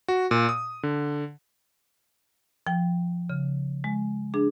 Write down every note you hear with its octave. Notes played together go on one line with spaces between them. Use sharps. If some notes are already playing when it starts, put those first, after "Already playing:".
F#4
A#2
D#6
D3
F3 G5
C#3
G#3
D4 G#4